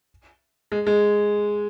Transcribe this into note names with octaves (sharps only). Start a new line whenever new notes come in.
G#3
G#3